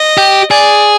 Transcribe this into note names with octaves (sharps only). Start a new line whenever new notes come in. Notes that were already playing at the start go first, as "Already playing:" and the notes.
Already playing: D#5
G4
G#4 D5